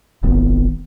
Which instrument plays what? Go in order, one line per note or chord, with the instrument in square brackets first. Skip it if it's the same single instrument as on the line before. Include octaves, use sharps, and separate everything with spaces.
[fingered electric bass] D#1 G#1 D#3 B3